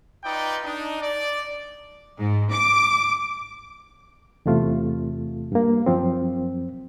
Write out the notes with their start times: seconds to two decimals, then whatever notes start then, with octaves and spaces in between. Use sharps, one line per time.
0.24 D#4 F4 B4 D5 G5
0.64 D4 D#4
1.02 D5
2.20 G#2
2.52 D6
4.46 E2 C3 A3 F4
5.52 G2 A#3
5.86 F#2 F3 C4